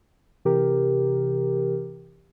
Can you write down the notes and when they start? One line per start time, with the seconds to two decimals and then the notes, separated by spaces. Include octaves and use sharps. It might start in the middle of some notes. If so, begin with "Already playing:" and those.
0.45 C3 E3 G4 A#4